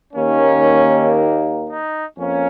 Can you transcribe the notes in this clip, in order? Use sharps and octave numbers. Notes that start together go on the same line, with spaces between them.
D#2 D#3 A#3 C#4
D#4
F2 A#3 C#4